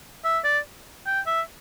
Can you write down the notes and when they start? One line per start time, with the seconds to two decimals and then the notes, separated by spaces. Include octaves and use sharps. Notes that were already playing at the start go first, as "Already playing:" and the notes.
0.24 E5
0.44 D5
1.06 G5
1.26 E5